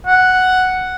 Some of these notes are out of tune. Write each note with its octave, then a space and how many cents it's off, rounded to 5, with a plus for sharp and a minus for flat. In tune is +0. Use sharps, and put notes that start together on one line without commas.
F#5 +0